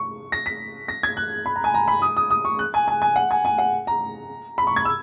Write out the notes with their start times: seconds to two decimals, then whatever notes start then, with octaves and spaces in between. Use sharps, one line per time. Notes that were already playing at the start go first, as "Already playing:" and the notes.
Already playing: C#6
0.32 A#6
0.46 B6
0.88 A#6
1.03 G#6
1.17 F#6
1.46 B5
1.56 A#5
1.64 G#5
1.74 A#5
1.88 B5
2.02 D#6
2.17 D#6
2.31 D#6
2.45 C#6
2.59 F#6
2.74 G#5
2.88 G#5
3.02 G#5
3.16 F#5
3.31 G#5
3.45 G#5
3.58 F#5
3.87 A#5
4.58 B5
4.67 C#6
4.76 G#6
4.85 E6